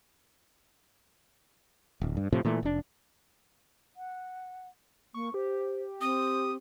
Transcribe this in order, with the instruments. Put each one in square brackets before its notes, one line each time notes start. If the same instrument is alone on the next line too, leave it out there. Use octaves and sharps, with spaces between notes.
[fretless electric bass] D1
G2
A2 C3 F3
A#2 E3 A3
F1 D4
[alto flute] F#5
[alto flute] A#3 [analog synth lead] C#6
[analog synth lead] G4 [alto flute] C5
[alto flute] C4 [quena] D#6